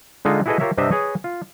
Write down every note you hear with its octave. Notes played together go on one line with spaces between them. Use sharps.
D3 G#3 D#4 F4
E4 F#4 G#4 A4 B4 D#5
F4 G4 A#4 C#5 E5
G2 C3 C4 D4 D#5 E5
G#4 B4 C#5 D#5
F4